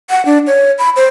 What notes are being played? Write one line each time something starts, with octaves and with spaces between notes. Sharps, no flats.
F#5
D4
C#5
B5
C5